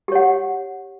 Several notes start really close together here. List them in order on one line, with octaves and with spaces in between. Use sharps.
G4 C#5 F#5